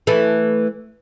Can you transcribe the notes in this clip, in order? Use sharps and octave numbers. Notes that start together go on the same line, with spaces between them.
E3 A3